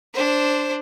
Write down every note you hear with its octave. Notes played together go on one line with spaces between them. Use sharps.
D4 C5